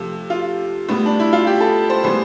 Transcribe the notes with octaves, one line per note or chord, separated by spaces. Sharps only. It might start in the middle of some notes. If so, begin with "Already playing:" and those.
Already playing: C3 F3 A3
F4
A2 G3 B3
D4
E4
F4
G4
A4
C5
A2 E3 G3 B3 C5